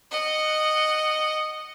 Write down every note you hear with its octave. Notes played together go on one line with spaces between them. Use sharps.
D#5 F#5